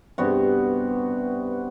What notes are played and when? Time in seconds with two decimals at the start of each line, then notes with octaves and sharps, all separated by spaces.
0.18 G2 C3 B3 F#4